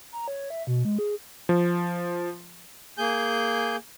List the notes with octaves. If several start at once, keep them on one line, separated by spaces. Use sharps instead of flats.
A#5
C#5
E5
B2
G#3
G#4
F3
A#3 G#4 G#5 G6